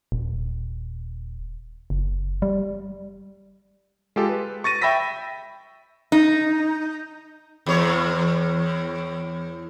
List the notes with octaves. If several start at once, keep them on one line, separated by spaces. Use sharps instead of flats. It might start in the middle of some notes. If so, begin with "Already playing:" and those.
D#1
F#1
G3
G#3 F4 G4 A4
B4
C#6 A6 A#6 D#7
E5 G5 B5 E6 A#6 B6
D#4
E2 C#5